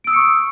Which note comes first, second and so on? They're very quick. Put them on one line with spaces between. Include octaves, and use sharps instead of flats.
D7 E6 D#6 C#7 C#6